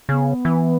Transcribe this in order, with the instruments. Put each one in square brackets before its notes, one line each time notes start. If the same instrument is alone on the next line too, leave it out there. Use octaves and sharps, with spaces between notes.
[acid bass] C#3 [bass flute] B3
[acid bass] E3